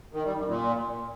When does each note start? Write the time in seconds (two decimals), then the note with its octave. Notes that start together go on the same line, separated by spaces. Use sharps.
0.14 D#3
0.25 G3
0.37 F#2
0.48 A#2